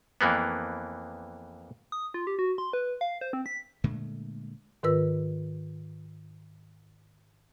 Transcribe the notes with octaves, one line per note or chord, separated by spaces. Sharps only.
F2 E3 A#3 B3
D#6
F4
G4
F#4
C6
B4
F5
C5
C4
B6
A#2 D3 G#3 A3
G#2 D#3 F4 A#4 B4 E6